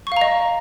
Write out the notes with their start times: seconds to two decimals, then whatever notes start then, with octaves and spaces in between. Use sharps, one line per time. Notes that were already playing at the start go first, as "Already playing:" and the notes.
0.07 C#6
0.12 F5
0.17 A#5
0.21 D#5